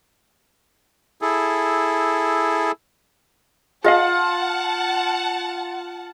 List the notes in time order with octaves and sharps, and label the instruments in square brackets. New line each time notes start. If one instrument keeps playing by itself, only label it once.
[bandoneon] E4 G#4 A4
[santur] F4 [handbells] G#4 D#5 F5 [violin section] F#5 A5